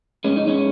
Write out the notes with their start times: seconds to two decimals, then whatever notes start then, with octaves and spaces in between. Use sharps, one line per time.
0.24 G#2 G#3 C#4
0.36 D#4
0.47 G#3 C#4